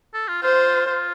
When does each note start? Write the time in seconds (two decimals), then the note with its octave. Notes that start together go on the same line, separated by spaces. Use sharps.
0.13 A4
0.28 F4
0.43 F4 C5
0.86 F4